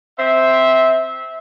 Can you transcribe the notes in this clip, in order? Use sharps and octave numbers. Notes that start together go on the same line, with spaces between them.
C4 C5 E5